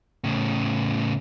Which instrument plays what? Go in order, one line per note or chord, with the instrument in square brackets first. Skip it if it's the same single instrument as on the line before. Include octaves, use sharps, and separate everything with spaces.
[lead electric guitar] A2 C#3